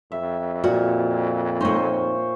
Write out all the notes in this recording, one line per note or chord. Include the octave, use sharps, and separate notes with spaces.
F2 E5
A#2 F#4
A3 D#4 C5 C#5